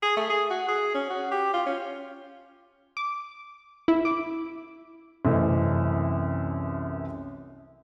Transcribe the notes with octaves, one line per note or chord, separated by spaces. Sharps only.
G#4
A3
G#4
F#4
G#4
C#4
F#4
G4
F4
C#4
D6
E4
D6
C2 F#2 E3 A3 C4 D#5